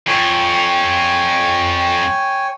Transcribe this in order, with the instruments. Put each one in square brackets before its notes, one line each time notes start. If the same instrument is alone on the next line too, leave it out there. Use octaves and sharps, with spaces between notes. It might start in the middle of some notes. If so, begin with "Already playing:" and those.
[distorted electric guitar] F2 [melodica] C#5 G5 G#5